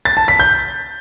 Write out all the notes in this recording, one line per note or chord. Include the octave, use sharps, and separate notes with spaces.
A6
A5
B6
G6